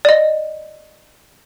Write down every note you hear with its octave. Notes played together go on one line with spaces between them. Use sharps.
D5 D#5